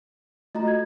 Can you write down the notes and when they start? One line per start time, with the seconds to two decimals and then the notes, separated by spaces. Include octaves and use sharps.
0.55 A3 F4 F#4 D#5 A#5
0.68 G#6